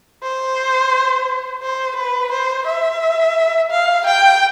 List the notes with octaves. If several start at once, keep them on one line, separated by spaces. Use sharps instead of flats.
C5
C5
B4
C5
E5
F5
G5